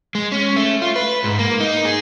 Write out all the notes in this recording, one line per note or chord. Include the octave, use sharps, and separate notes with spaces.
G#3
C#4
A3
F4
B4
G#2
A#3
D#4
G#4